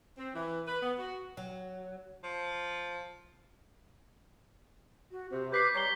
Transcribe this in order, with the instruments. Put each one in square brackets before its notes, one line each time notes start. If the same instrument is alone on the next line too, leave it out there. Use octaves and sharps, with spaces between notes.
[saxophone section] C4
E3
B4
B3
F#4
[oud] F#3
[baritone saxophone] F3
[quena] F#4
[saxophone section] C3 [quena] C5
[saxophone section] B4 [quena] D6 [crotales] G6 B6 C7
[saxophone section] G3 C#5 D5 [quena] A#5 [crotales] G#6 C7 G7